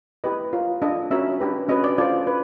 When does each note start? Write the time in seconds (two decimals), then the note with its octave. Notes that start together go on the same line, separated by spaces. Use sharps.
0.24 E4 G4 B4 D#5
0.53 F4 A#4 C#5
0.82 D4 F4 A4 D#5
1.11 C#4 F#4 A#4 C#5 E5
1.40 D4 G4 B4
1.69 C#4 F#4 B4 D#5
1.84 D5
1.98 F4 A4 C5 D5
2.27 B4